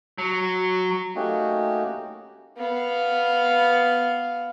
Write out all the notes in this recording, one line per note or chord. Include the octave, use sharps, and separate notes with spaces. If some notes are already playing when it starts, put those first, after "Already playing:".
F#3
A3 A#3 C#4 D#4 F#4 G4
B3 F5